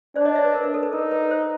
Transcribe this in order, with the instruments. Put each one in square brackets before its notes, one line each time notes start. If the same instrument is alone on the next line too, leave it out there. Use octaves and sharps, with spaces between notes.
[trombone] D4 [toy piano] C5 D5
[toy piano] C#5 D#5
D5 E5
B4
A#4
B4
A4
B4
[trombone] D#4 [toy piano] A#4
[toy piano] B4
C5